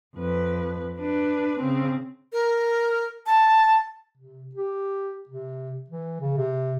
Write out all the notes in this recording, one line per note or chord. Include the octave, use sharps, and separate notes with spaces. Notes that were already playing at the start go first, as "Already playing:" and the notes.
F2 B4
D4 B4
C#3 C4
A#4
A5
C3
G4
C3
E3
C#3
C3